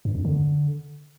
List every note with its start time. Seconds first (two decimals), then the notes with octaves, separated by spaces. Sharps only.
0.05 G2
0.15 F2
0.25 D3